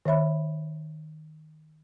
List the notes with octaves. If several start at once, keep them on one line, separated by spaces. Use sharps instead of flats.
D#3 C#5 E5 B5